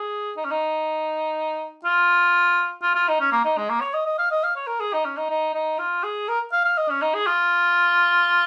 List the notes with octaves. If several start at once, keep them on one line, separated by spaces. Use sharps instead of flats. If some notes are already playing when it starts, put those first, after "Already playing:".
Already playing: G#4
D#4
C#4
D#4
F4
F4
F4
D#4
C#4
A#3
D#4
G#3
A#3
C#5
D#5
D#5
F5
D#5
F5
C#5
A#4
G#4
D#4
C#4
D#4
D#4
D#4
F4
G#4
A#4
F5
F5
D#5
C#4
D#4
G#4
F4